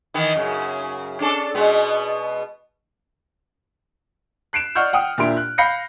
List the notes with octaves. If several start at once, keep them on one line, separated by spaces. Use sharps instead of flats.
D#3 E3 B3
F#2 C#3
C#4 D4 A4
B2 G#3 B3
F#6 C7 D7 E7
D5 D#5 F#5 C#6 F6 G6
F#5 G5 D#6 F6
A#2 D4 E4 G4 C6 D7
F#6
F5 B5 G6 A#6 C7 C#7